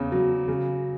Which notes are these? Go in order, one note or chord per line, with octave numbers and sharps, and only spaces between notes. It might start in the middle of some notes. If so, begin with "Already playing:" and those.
Already playing: E2 C#3
F#3
C#3